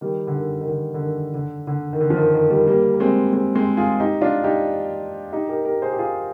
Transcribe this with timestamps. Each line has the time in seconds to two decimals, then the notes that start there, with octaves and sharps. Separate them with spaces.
0.01 D#3 G3
0.27 D3
0.35 D#3
0.61 D#3
0.68 D3
0.94 D3
1.00 D#3
1.34 D3
1.67 D3
1.93 D#3
2.01 D3
2.10 F3
2.17 D#3
2.34 D#3
2.50 D#3 G3
2.67 G3 A#3
2.94 A#3
3.00 G#3 C4
3.33 G#3 C4
3.55 G#3 C4
3.77 F4 G#4
4.00 D#4 G4
4.21 D4 F4
4.44 D#4 G4
5.32 D#4 G4
5.49 G4 A#4
5.65 G4 A#4
5.82 G#4 C5
5.93 G4
5.99 F4 G#4